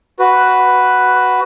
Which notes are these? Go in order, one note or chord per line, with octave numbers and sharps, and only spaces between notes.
F#4 B4